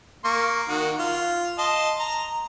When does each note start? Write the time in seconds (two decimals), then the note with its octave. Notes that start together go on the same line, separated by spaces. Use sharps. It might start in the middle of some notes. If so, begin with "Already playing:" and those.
0.25 A#3 C#6
0.69 D#3 F#4
0.99 F4
1.58 D#5 A5 C6
1.99 A#5